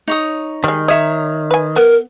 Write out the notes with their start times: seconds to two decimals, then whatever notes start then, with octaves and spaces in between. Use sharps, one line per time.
0.08 D#4 C#5 D#6
0.64 D#3 G3 G#3
0.88 C#5 D#5 E5 A#5
1.51 B4 G#5
1.76 B3 A#4